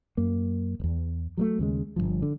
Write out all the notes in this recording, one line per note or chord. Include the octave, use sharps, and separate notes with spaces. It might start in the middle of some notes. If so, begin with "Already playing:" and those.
F#2 A#3
D1 E2
F#3 G3 A3
D#2 C#3 G#3
G1 E2 G2 F3
D3